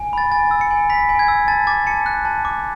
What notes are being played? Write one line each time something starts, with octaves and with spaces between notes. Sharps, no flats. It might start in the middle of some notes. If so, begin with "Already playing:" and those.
Already playing: G#5
B5 A6
G#5 A6
E6
C#7
G#5
B5 B6
G#5
G#6
E6
A5 A6
D6 A6
A5 C#7
F#6
A5
D6